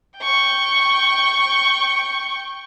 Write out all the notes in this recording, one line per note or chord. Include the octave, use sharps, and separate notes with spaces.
G5 C#6